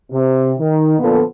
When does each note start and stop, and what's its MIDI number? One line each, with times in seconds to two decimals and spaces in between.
0.11 0.54 48
0.59 0.96 51
0.99 1.21 46
0.99 1.21 50
0.99 1.21 53
0.99 1.21 59
0.99 1.21 65
0.99 1.21 69